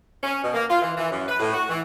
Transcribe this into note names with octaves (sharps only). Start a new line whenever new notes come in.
C#4
B2
A#3
F4
E3
E3
F#2
B4
A2
F#4
E3